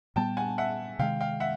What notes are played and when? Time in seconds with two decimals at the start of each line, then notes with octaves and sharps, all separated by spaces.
0.16 A#2 G3 B3 G5 A5
0.37 F#5 G#5
0.58 E5 F#5
0.99 C3 D#3 G#3 F5 G5
1.20 F5 G5
1.40 E5 F#5